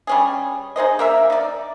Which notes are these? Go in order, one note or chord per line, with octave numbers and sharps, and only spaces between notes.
G3 C#4 G#4
D#4 G#4 C5 D#5
A#3 A#4 E5
D#4 D5